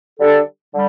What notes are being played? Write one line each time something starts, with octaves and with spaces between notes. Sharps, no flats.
D3 G3 D4 A4
D3 G3